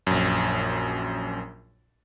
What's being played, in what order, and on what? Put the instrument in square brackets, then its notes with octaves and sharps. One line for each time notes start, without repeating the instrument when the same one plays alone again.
[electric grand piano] A#1 F#2